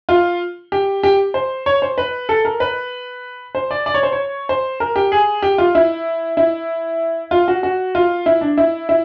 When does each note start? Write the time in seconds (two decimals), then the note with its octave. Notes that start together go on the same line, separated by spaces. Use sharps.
0.09 F4
0.72 G4
1.03 G4
1.34 C5
1.66 C#5
1.82 C5
1.98 B4
2.29 A4
2.45 A#4
2.60 B4
3.55 C5
3.71 D5
3.86 D5
3.94 C#5
4.03 C5
4.12 C#5
4.49 C5
4.80 A#4
4.96 G4
5.12 G#4
5.42 G4
5.58 F4
5.75 E4
6.37 E4
7.31 F4
7.48 F#4
7.63 F#4
7.95 F4
8.26 E4
8.41 D4
8.57 E4
8.89 E4